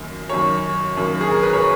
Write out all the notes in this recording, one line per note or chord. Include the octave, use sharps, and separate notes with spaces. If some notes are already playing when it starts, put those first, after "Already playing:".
Already playing: F#2 D#3 A#3
F#2 D#3 A#3 C#5
F#2 D#3 A#3
G#4
A#4
B4
C#5